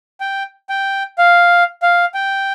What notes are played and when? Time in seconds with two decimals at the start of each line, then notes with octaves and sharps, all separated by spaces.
0.21 G5
0.69 G5
1.18 F5
1.82 F5
2.14 G5